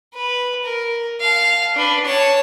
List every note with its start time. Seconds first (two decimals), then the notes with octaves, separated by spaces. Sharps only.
0.14 B4
0.63 A#4
1.20 F5 A5
1.75 D4 B4
2.05 C#5 A5